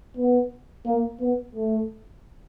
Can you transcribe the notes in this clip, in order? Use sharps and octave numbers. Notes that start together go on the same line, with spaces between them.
B3
A#3
B3
A3